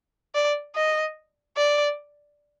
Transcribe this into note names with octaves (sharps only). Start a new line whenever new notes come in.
D5
D#5
D5